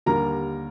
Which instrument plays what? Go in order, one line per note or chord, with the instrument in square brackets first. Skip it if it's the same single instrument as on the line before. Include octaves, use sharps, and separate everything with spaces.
[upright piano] D#2 D3 G3 A#4 A#5